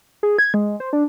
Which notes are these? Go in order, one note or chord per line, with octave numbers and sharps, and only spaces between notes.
G#4
G#6
G#3
C5
D4